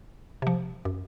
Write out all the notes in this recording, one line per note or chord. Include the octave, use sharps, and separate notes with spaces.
C3 F3
F#2